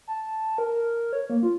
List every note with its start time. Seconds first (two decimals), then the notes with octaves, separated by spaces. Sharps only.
0.07 A5
0.58 A#4
1.13 C#5
1.30 A#3
1.43 F4